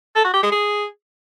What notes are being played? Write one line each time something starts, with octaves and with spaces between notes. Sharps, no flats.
A4
F#4
G4
G#3
G#4